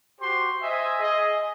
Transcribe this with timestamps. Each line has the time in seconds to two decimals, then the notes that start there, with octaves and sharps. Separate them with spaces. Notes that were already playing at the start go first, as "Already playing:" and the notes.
0.20 F#4 G4 C5 C6
0.61 C5 D#5 E5 G#5
1.00 G#4 D#5